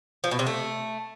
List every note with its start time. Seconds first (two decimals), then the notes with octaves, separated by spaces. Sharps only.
0.24 F3
0.31 B2
0.39 C3
0.47 A3